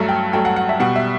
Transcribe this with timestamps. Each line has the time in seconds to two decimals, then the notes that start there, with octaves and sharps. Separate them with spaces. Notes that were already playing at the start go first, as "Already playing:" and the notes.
Already playing: G2 F#3 A3 A5
0.09 G5
0.33 G2 F#3 A3 G5
0.45 F#5
0.56 F#5
0.69 E5
0.80 B2 G3 F#5
0.96 E5